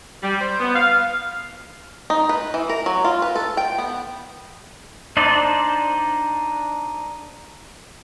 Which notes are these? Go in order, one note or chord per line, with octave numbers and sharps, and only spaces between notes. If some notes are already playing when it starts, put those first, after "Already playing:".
G3
C5
B3
F5
D#4
B4
E3
A#4
F#3
F4
B4
A4
G5
B3
D4 D#4 C5 D5